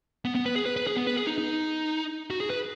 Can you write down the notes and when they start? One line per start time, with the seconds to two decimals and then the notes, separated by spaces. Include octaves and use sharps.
0.25 B3
0.35 B3
0.46 B4
0.55 G#4
0.66 B4
0.76 B4
0.87 G#4
0.97 B3
1.07 B4
1.17 G#4
1.27 D#4
1.38 D#4
2.30 F#4
2.40 G#4
2.50 B4